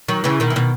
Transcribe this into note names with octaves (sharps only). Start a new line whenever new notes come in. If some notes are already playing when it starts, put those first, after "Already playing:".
D#3 F#3
C#3 E3
B2 D#3
E3
B2 D#3